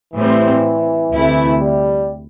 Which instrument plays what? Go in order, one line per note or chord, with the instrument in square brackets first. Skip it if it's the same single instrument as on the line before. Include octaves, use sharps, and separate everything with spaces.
[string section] A2 G3 C4 [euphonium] E3
[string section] D2 C3 A3 E4
[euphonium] G3